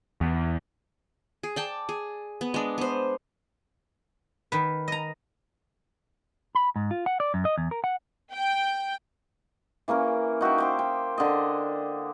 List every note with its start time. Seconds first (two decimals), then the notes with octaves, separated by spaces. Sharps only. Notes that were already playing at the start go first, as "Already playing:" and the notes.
0.21 E2
1.43 G#4
1.56 D5 G5 A5
1.89 G#4
2.41 B3
2.54 G#3 D4
2.78 B3 C5
4.52 D#3 B4
4.88 D#5 A#5
6.55 B5
6.76 G#2
6.91 F4
7.06 F#5
7.20 D5
7.34 F#2
7.45 D#5
7.58 E2
7.71 A#4
7.84 F#5
8.33 G5
9.88 E3 A#3 C#4 A#4
10.41 D#4 F#4 E5 G5
10.58 C5 G5 D6
10.79 G5
11.18 D3 D#5